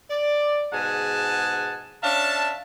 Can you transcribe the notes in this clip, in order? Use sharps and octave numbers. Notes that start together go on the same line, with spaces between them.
D5
G#2 B2 G#4 F#5 G#5 A5
C#4 D4 E5 F5 A5